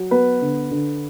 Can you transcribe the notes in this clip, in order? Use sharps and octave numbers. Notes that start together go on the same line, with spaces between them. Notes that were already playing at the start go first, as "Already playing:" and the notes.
Already playing: F#3
B3 B4
D3
D3